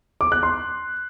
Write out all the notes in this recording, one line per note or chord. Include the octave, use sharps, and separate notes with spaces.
D6
F#6
C6